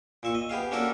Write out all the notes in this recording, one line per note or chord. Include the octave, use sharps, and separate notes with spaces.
A#2 E5 C#6
D#5
B3 G4 G#4 F5
A#3 C#4 D4 F#4 A4 A#4